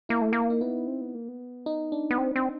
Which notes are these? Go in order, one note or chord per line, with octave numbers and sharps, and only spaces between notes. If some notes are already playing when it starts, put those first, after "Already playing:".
A#3 E4
A3
A#3
D#4
B3 E4
C4
B3
A#3
B3
D#4
D4
B3
C4
C4